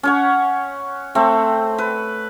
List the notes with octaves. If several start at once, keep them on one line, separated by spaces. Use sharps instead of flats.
C#4 C#5 F#5
A3 C4
B4